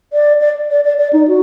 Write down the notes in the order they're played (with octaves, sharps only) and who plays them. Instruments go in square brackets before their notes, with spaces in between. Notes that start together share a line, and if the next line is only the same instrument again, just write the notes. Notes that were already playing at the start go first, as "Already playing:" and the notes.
[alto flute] D5
D5
D5
D5
D5
D#4
F#4